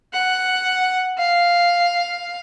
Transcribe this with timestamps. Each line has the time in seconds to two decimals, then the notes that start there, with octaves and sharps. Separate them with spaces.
0.13 F#5
1.18 F5